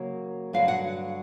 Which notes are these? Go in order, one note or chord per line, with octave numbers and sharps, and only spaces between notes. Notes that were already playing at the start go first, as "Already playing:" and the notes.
Already playing: C#3 F#3 A#3
G2 D3 F#3 F5
F#5